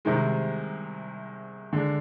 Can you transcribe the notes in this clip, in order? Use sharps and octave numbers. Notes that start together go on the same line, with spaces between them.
C2 C3 D#3 G#3
D3 G#3 D4